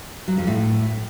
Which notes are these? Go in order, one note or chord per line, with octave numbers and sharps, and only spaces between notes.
F#3
F2
A2